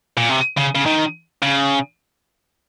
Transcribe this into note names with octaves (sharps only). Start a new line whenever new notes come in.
A#2
C3
C#3
C#3
D#3
C#3